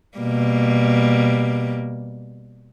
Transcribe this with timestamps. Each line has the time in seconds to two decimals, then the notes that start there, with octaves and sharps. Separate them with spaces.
0.18 B2 G3 A#3